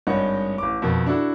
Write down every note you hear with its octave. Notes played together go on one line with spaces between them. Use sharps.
G#1 G2 C#5 D#5 F#5
A1 D6
F2 B2 D#3
D4 E4 F#4 A4